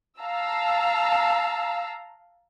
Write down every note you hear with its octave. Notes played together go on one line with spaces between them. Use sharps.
F5 A5 A#5 E6